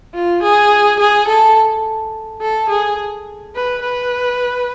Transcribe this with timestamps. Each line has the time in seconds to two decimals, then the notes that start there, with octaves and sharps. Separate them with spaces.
0.15 F4
0.43 G#4
1.00 G#4
1.28 A4
2.42 A4
2.70 G#4
3.55 B4
3.82 B4